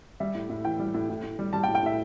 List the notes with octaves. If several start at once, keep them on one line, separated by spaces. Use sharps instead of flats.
G3 E5
A2
A2
E3 G5
G3
A2
A2
A2
G3
G3 A5
G5
A2
G5
A2 E5